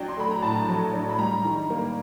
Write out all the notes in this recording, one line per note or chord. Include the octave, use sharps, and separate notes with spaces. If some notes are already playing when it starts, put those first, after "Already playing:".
Already playing: F#3 D4 G5
C6
A3 B5
A#5
A2 A5
F#3
D4
B5
G3 A#5
D#3
A#3